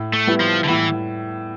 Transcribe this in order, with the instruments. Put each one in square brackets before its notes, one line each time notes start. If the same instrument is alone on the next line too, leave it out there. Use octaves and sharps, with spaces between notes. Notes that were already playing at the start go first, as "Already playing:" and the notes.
Already playing: [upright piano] A2
[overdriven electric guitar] A3
[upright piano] G3 B3 E4
[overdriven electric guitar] F3
D3
[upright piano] A2 [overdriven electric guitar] E3